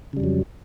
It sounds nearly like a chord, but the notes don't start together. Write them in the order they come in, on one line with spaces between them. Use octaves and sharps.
C#3 G3 F2 F#3